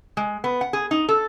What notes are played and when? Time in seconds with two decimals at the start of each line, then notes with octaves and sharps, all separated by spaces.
0.17 G#3
0.44 B3
0.61 F#5
0.73 G#4
0.91 D#4
1.09 A4